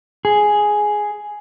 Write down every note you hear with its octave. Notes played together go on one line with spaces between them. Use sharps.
G#4